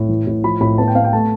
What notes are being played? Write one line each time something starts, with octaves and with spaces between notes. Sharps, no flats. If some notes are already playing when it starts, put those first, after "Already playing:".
Already playing: A2
E3
A2
F3 B5
A2 B5
B3 A5
G5
B3 F5
G5
A3 A5